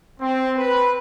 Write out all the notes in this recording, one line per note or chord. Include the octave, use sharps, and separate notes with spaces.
C4
B4